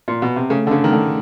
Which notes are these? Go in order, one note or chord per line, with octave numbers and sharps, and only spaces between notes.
A#2
B2
C3
C#3 A3
D3
C#3 D4
D#3
D3 A3